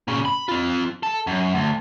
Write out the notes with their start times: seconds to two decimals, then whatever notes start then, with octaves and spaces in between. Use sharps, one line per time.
0.08 A#2 C#3
0.25 B5
0.49 C4 F4
1.03 A4
1.27 F#2
1.55 D2